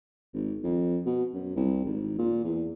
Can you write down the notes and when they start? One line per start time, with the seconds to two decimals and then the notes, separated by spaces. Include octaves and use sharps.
0.33 G#1
0.64 F2
1.06 B2
1.34 F#2
1.56 C2
1.85 G#1
2.18 A#2
2.44 E2